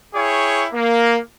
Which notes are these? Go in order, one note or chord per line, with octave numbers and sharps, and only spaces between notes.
E4 G#4 C#5 G5 C#6
A#3